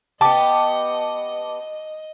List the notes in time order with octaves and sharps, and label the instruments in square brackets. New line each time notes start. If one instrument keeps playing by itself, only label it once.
[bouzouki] B3 G4 [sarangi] D#5 [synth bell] A5 D6